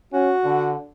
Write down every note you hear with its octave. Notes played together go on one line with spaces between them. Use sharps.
C#4 F#4
D3